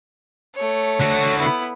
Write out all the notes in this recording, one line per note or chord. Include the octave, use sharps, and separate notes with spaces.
A3 C#5
D3 F#4
B3 E4